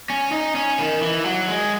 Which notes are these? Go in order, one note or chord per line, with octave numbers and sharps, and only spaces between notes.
C#4
D#4
C#4
D#3
E3
F#3
G#3